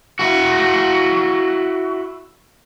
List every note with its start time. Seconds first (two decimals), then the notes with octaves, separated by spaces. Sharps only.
0.19 E4 F#4